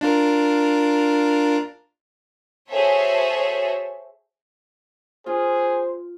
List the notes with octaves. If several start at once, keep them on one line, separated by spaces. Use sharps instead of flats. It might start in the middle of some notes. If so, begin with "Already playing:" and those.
D4 F4 A#4
F#4 G#4 A4 C5 C#5 E5
F4 G#4 C5